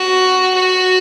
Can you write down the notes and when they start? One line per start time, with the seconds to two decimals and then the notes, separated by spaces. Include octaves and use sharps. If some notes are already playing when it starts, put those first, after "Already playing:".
Already playing: F#4
0.55 F#4